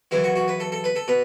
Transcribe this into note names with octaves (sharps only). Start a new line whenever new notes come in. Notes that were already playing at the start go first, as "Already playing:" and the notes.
F#2 C#3 E3 E4
F#4
F#4
B4
A4
A4
B4
A4
B2 B4